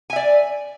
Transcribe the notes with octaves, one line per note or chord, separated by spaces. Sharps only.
D5 E5 G#5